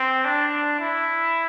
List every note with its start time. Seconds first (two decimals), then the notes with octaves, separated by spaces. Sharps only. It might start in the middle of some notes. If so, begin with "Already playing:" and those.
Already playing: C4
0.25 D4
0.79 E4